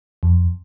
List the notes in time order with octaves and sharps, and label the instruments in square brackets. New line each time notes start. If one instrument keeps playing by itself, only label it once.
[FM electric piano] F2